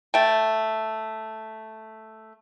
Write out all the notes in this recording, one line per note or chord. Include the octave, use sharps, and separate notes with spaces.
A3 G5